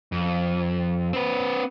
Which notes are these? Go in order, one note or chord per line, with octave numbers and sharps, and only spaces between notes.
F2
C4 B4